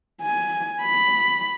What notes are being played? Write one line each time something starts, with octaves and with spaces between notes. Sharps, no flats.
G#5
B5